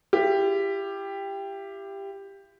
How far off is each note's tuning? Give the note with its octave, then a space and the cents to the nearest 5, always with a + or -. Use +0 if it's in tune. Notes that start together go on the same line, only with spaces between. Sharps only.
E4 +45 G4 +10